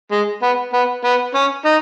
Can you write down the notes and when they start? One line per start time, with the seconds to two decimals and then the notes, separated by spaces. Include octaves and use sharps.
0.11 G#3
0.42 B3
0.73 B3
1.04 B3
1.35 C#4
1.66 D#4